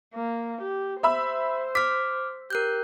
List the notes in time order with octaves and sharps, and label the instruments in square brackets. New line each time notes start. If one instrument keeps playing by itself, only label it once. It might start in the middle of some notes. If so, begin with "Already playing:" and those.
[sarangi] A#3
G4
[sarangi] C5 [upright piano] E5 B5 E6
[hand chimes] D6 F6 [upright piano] B6
[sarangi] G4 [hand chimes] A#4 F#6 G6